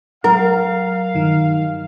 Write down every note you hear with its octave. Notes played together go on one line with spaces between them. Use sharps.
F#3 A#4 F5 A#5
G2 D#3